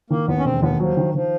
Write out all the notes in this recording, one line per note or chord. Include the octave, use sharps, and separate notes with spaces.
D#3 A#3
D#2 B3
C#4
E1 C4
D#2 B3
F3 F#3
D#3
D#3 F3